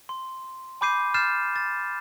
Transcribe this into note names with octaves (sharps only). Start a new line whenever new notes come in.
C6
G#5 B5 D6 G6 C7 D#7
F6 G6 A6 C7 E7
A6